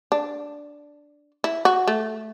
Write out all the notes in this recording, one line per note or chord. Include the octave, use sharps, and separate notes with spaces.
D4
E4
F#4
A3